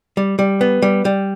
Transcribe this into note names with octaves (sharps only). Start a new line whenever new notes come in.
G3
G3
B3
G3
G3